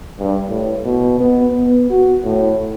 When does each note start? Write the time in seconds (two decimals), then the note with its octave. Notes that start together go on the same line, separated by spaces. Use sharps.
0.19 G2
0.49 A2
0.85 B2
1.20 B3
1.50 B3
1.90 F#4
2.24 A2